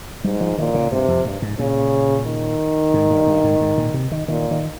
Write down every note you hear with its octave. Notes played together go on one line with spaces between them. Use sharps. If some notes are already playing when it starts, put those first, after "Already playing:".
G#2 G3
F3
A#2 D#3
C#3
G2 C3
F2
G2
G#2
A#2 C#3
D#3
G#2
G2
G2
G#2
G#2
A#2
C3
D#3
A#2 D#3
D#3